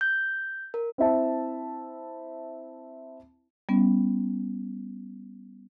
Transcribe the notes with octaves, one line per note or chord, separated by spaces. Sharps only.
G6
A#4
C4 E4 E5 A5
G3 B3 C#4